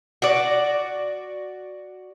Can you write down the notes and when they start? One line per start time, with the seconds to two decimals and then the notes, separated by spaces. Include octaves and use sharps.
0.22 F#4 D5